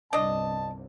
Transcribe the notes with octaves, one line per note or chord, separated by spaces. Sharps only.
G1 C2 C3 D4 D#5 A5